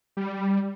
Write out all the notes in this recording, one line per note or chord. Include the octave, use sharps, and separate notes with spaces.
G3